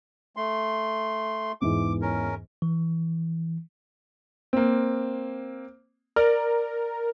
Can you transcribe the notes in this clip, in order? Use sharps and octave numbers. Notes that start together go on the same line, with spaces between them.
A3 C6
E2 G#2 E3 D6
C#4 A#4
E3
A#3 C4
A#4 D5